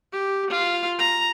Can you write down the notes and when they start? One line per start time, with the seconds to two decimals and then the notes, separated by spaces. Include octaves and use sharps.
0.12 G4
0.50 F4
0.99 A#5